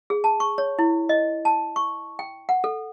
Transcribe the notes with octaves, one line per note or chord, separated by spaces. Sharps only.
G#4
A5
C#6
C#5
E4
D#5
A5
C#6
G5
F#5
A4